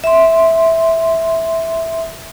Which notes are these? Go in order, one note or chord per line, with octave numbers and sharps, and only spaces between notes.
E5 C6